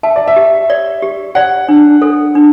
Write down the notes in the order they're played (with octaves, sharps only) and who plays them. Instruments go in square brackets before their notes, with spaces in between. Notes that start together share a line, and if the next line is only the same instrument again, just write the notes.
[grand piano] E5 [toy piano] A5
[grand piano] D5
E5
[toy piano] G4
D5
G4
[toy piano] D5 [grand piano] F#5
[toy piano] D4
A4
D4